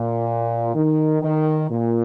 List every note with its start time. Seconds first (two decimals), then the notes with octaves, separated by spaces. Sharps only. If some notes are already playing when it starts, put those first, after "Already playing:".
Already playing: A#2
0.75 D#3
1.21 D#3
1.69 A#2